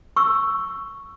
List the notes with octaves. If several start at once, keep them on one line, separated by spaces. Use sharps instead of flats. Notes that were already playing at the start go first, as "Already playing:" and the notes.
C#6 E6